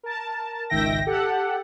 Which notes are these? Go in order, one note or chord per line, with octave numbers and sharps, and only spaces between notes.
A#4 A5
G#1 C#2 D#3 E5 G5 A#6
G4 A4 F#5